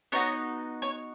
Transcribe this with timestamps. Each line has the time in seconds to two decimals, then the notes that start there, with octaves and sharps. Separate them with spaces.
0.12 B3 D#4 F#4 C#5
0.82 C#5